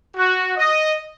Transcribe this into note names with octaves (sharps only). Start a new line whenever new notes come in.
F#4
D#5